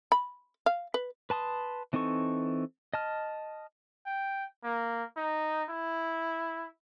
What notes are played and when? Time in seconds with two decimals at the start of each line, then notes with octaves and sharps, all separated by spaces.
0.12 B5
0.66 F5
0.94 B4
1.30 B4 A5 C6 D#6
1.93 E3 C4 D#4 A4 C#6
2.94 D#5 A5 F6
4.06 G5
4.63 A#3
5.16 D#4
5.69 E4